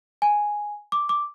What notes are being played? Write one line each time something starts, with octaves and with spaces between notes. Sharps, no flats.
G#5
D6
D6